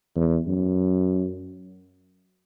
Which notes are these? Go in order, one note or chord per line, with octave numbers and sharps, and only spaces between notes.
E2
F#2